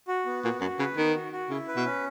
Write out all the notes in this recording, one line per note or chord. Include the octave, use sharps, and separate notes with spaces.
F#4
B3
A#2 F#4
F#2 F#4
C#3 B4
D#3 B3
F#4
F#4
C#3 E4
B4
B2
C#4